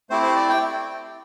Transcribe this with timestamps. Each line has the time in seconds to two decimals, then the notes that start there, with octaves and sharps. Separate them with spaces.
0.10 A3 C4 E4 G4 C5
0.23 C5
0.36 D5
0.49 G5